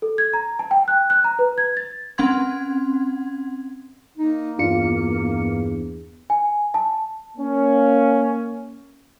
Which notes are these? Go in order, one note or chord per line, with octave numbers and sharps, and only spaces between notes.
A4
G#6
A#5
A5
G5
F#6
F#6
A#5
B4
G#6
A6
C4 C#4 F#5 C6 G#6
A#3 D#4
E2 G2 D4 F4 C#7
G#5
A5
A#3 C#4